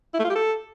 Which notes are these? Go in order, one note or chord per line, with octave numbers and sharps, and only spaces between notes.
E4
A3
F4
G4
A4